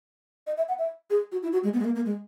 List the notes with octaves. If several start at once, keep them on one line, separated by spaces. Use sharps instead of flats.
D#5
E5
F#5
E5
G#4
F#4
E4
F#4
G#3
B3
G#3
A#3
A#3
G#3